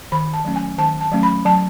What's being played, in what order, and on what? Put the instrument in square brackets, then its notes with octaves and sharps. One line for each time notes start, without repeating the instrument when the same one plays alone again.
[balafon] D#3 B5
A5
F#3 A3 C#4
G#5
D#3 A5
A5
F#3 A3 C#4
B5
F#3 A5